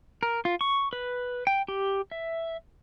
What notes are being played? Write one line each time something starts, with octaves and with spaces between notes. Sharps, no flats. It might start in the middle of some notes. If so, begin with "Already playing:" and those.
A#4
F4
C#6
B4
G5
G4
E5